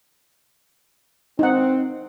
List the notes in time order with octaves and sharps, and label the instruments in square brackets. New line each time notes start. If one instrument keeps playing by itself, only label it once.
[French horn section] C4 [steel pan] D#4 F#5